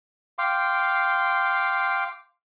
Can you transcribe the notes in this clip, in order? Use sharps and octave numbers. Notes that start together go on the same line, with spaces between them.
F5 G5 C6 D6